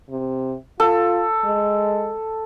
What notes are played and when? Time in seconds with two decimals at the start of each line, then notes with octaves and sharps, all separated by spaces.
0.10 C3
0.80 F4 A4
1.45 G#3